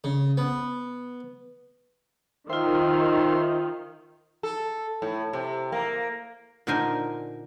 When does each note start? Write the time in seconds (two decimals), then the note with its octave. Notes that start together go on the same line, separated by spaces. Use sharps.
0.04 C#3
0.37 B3
2.50 D#3 F4 C5 E5 F5 G5 C6
4.43 A4
5.02 A2
5.33 C3
5.72 A#3
6.67 A#2 D3 D#4 A#4 C5 G#5